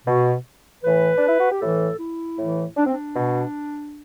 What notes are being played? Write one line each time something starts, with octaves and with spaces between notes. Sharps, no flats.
B2
A2 E3 B4
D4
E4
F#4
G4
A2 E3 A4
E4
A2 E3
D4
C4
D4
B2